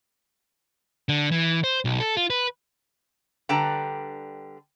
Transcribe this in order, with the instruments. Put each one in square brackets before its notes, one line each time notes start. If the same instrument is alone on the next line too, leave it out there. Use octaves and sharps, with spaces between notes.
[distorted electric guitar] D3
E3
C5
B1
A4
F4
B4
[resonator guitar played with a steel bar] D3 G3 B4 G5 A5 A#5